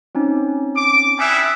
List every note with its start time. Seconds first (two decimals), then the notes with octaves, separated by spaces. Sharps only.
0.15 C4 C#4 D#4
0.76 D6
1.19 G3 E4 E5 G#5 D#6 F#6